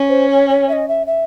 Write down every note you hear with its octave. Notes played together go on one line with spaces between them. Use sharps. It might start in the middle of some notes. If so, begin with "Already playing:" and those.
Already playing: C#4
C5
C#5
C#5
E5
D#5
E5
E5